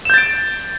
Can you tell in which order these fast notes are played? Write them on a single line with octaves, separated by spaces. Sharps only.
E7 G6 A6 D7